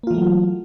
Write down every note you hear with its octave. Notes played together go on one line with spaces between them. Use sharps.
E3 F#3 A3 A#3 F4